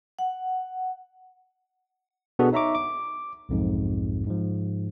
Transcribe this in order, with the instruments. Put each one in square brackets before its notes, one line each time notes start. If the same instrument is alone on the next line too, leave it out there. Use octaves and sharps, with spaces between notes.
[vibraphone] F#5
[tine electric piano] B2 B3 D4 F#4 G#4 A4
D#4 C#5 E5 A#5 C#6 D6
D6
B1 F2 G#2
G#2 F3